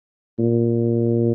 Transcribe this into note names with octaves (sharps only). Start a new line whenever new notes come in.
A#2